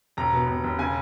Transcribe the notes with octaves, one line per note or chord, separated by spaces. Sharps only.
E1 A#5
B2
E1
E1
C#3 G#5